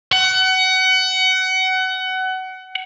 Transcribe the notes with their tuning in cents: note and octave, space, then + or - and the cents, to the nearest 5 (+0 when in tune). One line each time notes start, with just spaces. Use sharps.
F#5 +25